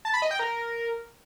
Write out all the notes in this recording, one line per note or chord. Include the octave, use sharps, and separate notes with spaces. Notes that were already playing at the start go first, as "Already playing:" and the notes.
A5
B5
D#5
G5
A#4